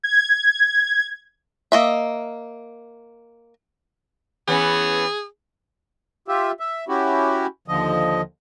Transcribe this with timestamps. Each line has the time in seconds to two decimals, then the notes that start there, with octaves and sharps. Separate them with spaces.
0.03 G#6
1.72 A#3 D#5 E5
4.48 E3 B3 C#4 G#4
6.28 F4 G4 E5
6.60 E5
6.88 C#4 E4 F#4 G4
7.68 D#2 D3 F3 D#5